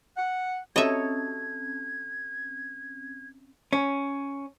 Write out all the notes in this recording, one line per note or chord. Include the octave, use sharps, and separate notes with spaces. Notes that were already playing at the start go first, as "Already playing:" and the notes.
F#5
C4 C#4 A4 C#5 D#5 E5 G#6
C#4